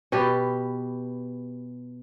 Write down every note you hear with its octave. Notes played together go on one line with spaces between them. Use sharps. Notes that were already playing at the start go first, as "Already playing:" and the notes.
B2 G4 B4